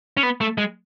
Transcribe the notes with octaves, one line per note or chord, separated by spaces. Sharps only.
C#4
B3
A3
G#3